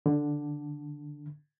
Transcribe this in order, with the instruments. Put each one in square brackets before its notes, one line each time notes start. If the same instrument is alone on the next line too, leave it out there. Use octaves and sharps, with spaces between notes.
[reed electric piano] D3